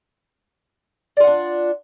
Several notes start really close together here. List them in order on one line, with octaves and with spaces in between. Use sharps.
D5 F4 F#5 D4